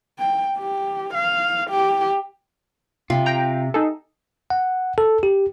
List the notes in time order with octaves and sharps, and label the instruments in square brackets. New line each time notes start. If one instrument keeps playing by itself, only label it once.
[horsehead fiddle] G5
G4
F5
G4
[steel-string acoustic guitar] C3 [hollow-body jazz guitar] F4
[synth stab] G5 A#5
D#4 G#4 A4
[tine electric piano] F#5
A4
G4